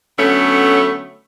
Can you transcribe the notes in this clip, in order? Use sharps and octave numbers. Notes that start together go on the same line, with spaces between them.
D3 F#3 A3 B3 C#4